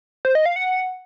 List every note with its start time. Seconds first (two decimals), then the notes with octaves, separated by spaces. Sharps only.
0.25 C5
0.35 D#5
0.46 F5
0.56 F#5